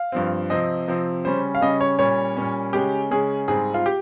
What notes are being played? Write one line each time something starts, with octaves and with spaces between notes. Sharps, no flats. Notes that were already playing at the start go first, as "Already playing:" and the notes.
Already playing: F5
G2 F3 C4
C3 F3 C4 D#5
C3 F3 C4
C#3 G3 C#4 C5
F5
C#3 G3 C#4 D#5
C#5
A#2 G3 C#4 C#5
A#2 G3 C#4
C#3 G#3 C#4 G4
C#3 G#3 C#4 G#4
G#2 G3 C4 G#4
F4
G4